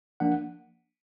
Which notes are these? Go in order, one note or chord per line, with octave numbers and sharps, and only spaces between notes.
F3 A#3 D4 F#5